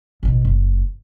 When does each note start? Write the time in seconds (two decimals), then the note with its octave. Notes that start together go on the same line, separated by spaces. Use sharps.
0.23 A1 B2
0.45 F#1